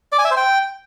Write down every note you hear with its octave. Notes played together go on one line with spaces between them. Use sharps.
D5
G#5
E5
C5
G5